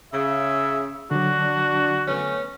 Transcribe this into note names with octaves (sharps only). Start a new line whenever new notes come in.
C#3 E5
D3 F#3 D4 F#4
A3 B3 C#4